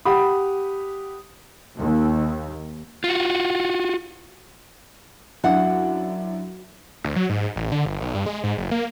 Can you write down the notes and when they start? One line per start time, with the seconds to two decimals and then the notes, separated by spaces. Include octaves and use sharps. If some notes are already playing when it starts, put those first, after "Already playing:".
0.05 G4 F#5 B5 D#6
1.78 D#2
3.04 F4 F#4
5.44 F#2 D4 E4 F#4 F#5
7.05 D2
7.16 F#3
7.29 G#2
7.56 A1
7.72 D3
7.86 G1
8.01 B1
8.14 G2
8.26 G#3
8.44 G#2
8.57 F#1
8.71 A#3